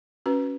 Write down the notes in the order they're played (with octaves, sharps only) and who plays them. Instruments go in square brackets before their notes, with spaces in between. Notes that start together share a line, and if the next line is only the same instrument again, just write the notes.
[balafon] C#4 F#4 B4